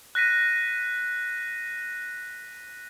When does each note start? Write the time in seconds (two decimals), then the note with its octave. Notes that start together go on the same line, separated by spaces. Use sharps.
0.15 F#6 A#6 B6 D#7